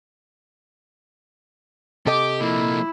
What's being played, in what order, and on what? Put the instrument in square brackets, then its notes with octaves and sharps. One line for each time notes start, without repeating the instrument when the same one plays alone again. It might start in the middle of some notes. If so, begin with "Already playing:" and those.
[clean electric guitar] C3 A4 D#5 [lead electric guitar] G4 [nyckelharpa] D6
[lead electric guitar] F3 A#3 [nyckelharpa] E4